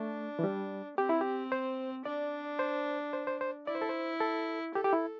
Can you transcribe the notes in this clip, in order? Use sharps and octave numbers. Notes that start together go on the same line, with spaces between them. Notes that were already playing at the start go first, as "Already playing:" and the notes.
Already playing: A3 D4
E3
G3
C4 G4
E4
G4
C5
D4 D5
C5
C5
C5
C5
E4 D5
C5
A4
C5
A4
G4 A4
G4
E4